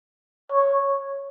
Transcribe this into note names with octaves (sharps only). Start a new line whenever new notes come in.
C#5